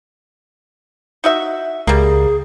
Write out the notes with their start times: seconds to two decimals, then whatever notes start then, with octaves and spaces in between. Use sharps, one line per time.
1.24 D#4 F#4 E5
1.87 C#2 G3 A#3 G#4